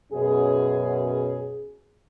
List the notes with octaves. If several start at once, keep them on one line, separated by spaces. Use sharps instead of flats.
F#2 B2 C#4 G#4